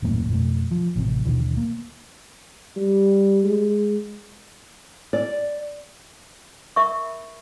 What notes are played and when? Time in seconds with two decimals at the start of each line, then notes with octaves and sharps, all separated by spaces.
0.02 D#1 F#2 A2 A#3
0.29 F2 B2 A3
0.71 F3
0.96 A1 C3
1.24 D#2 B2 D3 E3
1.57 A#3
2.77 G3
3.45 G#3
5.13 D5
6.76 A#4 E5 B5 C#6